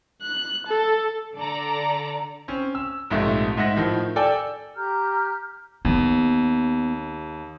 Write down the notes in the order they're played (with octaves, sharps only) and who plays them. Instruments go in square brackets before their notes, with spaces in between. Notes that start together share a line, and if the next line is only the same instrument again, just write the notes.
[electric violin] F#6
A4
[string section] D3 A4 D5 A#5
[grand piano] C4 C#4
E6
A#1 G#2 C3 A3
G#2 E5 F#5 A#6
A2 D#3 F3
A4 D5 G5 G#5 E6
[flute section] G4 A#5 F6 G6
[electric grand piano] D#2 [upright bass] B3